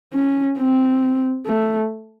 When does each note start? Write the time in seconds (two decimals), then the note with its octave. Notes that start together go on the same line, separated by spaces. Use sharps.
0.13 C#4
0.58 C4
1.46 A3